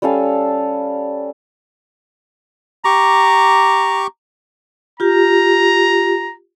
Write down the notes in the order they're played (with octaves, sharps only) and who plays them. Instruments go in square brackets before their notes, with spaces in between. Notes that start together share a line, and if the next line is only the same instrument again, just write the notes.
[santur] G3 C#4 A4 F5
[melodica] G4 C#6 D6 [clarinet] A#5
[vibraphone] F4 G4 [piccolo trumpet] A#5